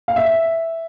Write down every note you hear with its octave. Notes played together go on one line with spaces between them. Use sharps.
F5
E5